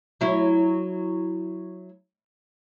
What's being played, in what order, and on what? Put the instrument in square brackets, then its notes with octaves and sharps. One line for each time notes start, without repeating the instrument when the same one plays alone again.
[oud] F#3 E4